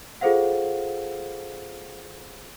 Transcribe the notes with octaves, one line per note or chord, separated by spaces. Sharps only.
F4 G#4 A4 C5 F5 F#5